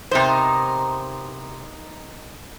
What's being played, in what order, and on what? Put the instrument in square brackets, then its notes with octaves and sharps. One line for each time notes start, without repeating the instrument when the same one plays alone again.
[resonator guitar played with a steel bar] C3 C5 [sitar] B3 D#4 A#4